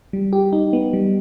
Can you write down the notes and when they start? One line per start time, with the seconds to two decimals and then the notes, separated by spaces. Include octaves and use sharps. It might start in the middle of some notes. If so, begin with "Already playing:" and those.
0.13 G3
0.33 G4
0.53 D#4
0.73 B3
0.93 G3